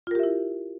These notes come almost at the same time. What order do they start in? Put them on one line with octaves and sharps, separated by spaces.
F4 A#4 G4 E5 E4